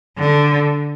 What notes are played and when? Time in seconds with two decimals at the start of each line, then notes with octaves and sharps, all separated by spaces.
0.18 D3